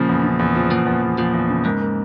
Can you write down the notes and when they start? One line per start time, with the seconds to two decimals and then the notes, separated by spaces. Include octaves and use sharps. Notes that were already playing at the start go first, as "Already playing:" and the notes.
Already playing: A#2 C#3 F3
0.09 E2
0.24 C#3
0.39 E2
0.55 F3
0.71 E2 A#2
0.86 E2
1.02 E2
1.18 A#2 F3
1.34 E2
1.50 C#3
1.65 G#2 A#3
1.81 A#3